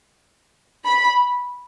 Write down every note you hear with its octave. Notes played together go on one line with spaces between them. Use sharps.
B5